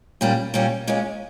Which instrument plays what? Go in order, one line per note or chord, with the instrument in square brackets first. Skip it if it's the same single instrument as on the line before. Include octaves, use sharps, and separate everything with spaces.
[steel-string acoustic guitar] A#2 G3 C#4
A#2 G3 C#4
A#2 G#3 C#4